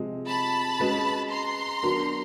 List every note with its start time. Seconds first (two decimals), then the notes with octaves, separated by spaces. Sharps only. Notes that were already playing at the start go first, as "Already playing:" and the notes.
Already playing: C3 F3 G#3
0.28 A5 B5
0.80 G#3 C#4 F#4 B4
1.31 A#5 C6
1.83 F#3 B3 D4 F#4 A#4